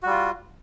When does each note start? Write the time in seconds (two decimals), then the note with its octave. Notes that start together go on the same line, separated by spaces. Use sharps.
0.03 F#4
0.06 G3
0.10 F4